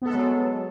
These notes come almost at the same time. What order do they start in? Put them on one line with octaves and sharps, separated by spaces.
B3 A4 G#3 F#3